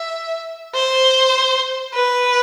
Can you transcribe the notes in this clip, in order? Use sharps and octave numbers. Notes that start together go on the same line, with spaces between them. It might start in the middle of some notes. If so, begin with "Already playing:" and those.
Already playing: E5
C5
B4